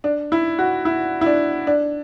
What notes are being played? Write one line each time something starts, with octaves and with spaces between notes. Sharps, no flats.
D4
E4
F#4
E4
E4
D4
D4